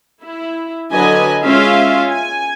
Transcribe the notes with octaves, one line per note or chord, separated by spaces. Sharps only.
E4
D3 F#3 B4 D#5 G#5
G#3 C#4 F4 E5 F5
G#5